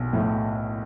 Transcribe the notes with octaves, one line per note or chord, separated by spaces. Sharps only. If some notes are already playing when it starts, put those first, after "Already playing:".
Already playing: B1
A2